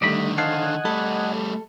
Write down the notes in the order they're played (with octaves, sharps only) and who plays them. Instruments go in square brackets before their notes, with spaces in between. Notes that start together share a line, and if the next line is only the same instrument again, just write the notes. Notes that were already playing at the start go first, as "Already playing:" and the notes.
[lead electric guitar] D3 D#3 [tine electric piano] G3 A3 [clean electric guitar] D5 D#5 B5
[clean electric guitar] C5 F5 [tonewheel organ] D#5 F#5 G#5 [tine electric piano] A5
[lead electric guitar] G3 A3 [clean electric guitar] A4 [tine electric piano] B5